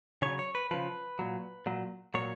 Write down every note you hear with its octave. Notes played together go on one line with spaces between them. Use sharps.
C#3 F#3 C#5
C#5
B4
C#3 F3 B4
A#2 F#3
A#2 F#3
A#2 F#3 C#5